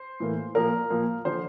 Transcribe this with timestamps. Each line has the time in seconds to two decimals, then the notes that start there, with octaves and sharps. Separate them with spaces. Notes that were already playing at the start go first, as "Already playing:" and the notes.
Already playing: C5
0.20 A2 E3 A#3
0.55 A#2 F3 A#3 A#4
0.90 A#2 F3 A#3
1.25 D3 F3 C5